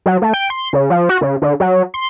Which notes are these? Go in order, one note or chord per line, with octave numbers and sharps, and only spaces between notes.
F#3
A3
G5
C6
C#3
F3
F#4
C#3
D3
F#3
C6